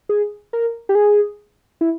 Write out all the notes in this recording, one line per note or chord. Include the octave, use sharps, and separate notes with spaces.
G#4
A#4
G4
G#4
E4